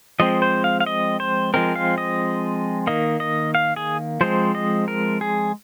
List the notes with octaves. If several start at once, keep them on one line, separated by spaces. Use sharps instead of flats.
F3 G#3 C4 D#5
C5
F5
F5
D#5
C5
F3 G#3 C4 A#4
F5
D#5
D#3 A#3 D#5
D#5
F5
G#4
F3 G#3 C4 C5
D#5
A#4
G#4